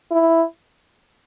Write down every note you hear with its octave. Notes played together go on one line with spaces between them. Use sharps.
E4